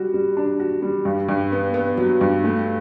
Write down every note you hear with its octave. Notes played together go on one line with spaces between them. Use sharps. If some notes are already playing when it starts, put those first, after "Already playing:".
Already playing: G3 F#4
G3
D4
F#4
G3
G2
G2
B3
B3
F#3
G2
A3